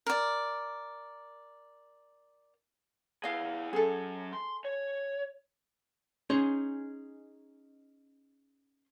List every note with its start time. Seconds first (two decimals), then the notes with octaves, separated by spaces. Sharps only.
0.07 A#4 D5
3.24 E4 G#4 D#5 F5
3.73 F#3 C#4 G#4 A4
4.33 C6
4.65 C#5
6.30 C#4 D#4 G#4 C5